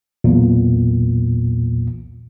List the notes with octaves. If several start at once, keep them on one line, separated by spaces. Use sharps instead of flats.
B1 E2 A#2